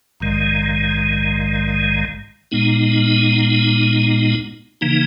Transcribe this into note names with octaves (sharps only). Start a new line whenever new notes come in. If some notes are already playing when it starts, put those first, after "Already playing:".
A#1 G#2 D#3 G#3
A#2 G#3 B3 D#4
C#3 E3 A#3 D#4